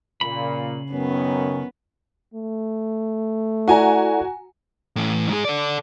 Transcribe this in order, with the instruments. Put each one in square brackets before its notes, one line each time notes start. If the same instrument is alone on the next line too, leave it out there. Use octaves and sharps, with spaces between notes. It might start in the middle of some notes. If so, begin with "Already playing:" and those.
[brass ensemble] A#2 [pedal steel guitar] C#3 A#3 B5
[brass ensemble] F#2 D#3 C#4 [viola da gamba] B3
[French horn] A3
[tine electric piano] E4 A4 D5 [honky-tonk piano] F#4 G#5 A#5
[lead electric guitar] A2 E3
G#2 G#4
A4 D5